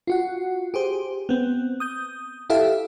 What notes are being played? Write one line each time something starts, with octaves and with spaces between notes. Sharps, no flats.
F4 F#4 F#5
G4 G#4 C5
B3 C4
D#6 G6
E4 G4 A4 E5 F5